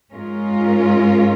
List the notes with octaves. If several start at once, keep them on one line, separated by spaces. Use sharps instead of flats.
G#2 G#3 C#4 F4 A#4